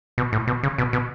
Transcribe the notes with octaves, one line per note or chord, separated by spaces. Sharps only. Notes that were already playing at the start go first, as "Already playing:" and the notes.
B2
A2
B2
C#3
B2
B2